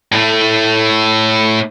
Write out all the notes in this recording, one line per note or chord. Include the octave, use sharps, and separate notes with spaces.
A2 A3